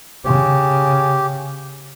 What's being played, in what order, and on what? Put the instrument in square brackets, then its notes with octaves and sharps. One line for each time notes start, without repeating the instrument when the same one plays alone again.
[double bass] C#3 [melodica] G4